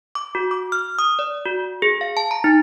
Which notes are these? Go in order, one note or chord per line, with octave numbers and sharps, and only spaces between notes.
D6
F#4
D6
F6
D#6
D5
F#4
G#4
F5
A5
A#5
D#4